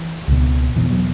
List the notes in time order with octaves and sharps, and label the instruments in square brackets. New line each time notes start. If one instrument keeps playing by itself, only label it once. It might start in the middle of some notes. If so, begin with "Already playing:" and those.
Already playing: [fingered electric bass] E3
C#2 B2
E2 B2 E3
F#3